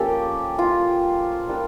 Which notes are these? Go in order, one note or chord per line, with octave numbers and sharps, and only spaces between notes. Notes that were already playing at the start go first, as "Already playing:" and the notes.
Already playing: F3 A#3 C#4 G4 A4
F4
G3 A#3 D4 F4